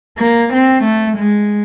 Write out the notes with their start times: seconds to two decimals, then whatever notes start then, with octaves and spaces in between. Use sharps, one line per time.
0.18 A#3
0.54 C4
0.84 A3
1.18 G#3